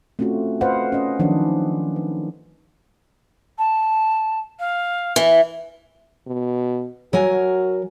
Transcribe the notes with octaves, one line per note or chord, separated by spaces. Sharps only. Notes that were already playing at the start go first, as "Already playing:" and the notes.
A3 C4 C#4 F4 F#4
F4 B4 C5 D#5 F5 F#5
C#4 D#5
D#3 F3 F#3 C#4 D4
B4
A5
F5
E3
B2
F#3 F#4 A#4 G#5